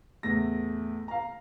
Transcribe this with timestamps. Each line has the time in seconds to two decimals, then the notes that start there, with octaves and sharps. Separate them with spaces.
0.23 E2 A2 A3 A#6
1.08 F5 A#5